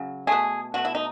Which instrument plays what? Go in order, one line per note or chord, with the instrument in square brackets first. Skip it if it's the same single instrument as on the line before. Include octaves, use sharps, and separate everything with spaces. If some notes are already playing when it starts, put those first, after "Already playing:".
Already playing: [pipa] C#3 F#3
B2 A3 G#4
B2 A3 F#4
E4
D#4